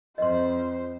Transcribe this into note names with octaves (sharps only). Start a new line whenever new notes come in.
F2 C5 D#5 C6